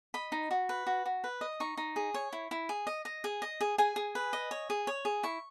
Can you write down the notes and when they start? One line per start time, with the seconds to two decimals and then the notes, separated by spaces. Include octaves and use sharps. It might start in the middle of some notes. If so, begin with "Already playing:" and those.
0.14 D#5 B5
0.32 D#4
0.51 F#4
0.69 B4
0.87 F#4
1.06 F#4
1.24 B4
1.41 D#5
1.60 D#4 C#6
1.77 D#4
1.96 G#4
2.14 C#5
2.33 E4
2.51 E4
2.69 G#4
2.87 D#5
3.05 D#5
3.24 G#4
3.42 D#5
3.61 G#4
3.78 G#4 G#5
3.96 G#4
4.15 B4
4.33 D#5
4.51 C#5
4.70 G#4
4.87 C#5
5.05 G#4
5.23 E4 C#6